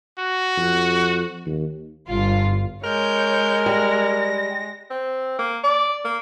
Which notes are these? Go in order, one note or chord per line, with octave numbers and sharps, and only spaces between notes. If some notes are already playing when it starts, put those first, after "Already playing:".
F#4
F2
D#2
G1 F4
G#3 A#4 C#5 G6
G3 A#6
C4
A#3
D5
A#3